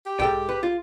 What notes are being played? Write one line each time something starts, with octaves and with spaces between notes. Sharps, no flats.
G4
B1 G#2 G#4 A4 G5
B4
F4